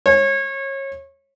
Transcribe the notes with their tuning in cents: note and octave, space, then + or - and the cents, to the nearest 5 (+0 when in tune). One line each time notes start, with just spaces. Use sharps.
C#5 -25